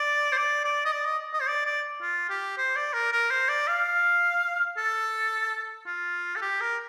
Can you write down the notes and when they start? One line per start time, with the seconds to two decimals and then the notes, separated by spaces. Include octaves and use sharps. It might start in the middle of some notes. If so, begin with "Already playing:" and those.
Already playing: D5
0.32 C5
0.37 D5
0.65 D5
0.85 D#5
0.92 D5
1.05 D#5
1.33 D#5
1.41 C5
1.47 D5
1.65 D5
2.02 F4
2.30 G4
2.58 C5
2.76 D5
2.93 A#4
3.12 A#4
3.31 C5
3.49 D5
3.67 F5
4.77 A4
5.86 F4
6.36 A4
6.42 G4
6.61 A#4